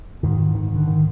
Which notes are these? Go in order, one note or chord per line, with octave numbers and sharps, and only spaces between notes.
G#2 D#3
D#3
D3
D#3